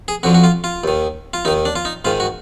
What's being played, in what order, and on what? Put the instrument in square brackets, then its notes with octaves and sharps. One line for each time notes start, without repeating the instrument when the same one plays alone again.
[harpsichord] G#4
F2 D3 F3 F#4
F#4
F4
F4
D#2 D#3
F4
D#2 D#3 D#4
D4
F4
D#4
G#2 D#3 F4
F#4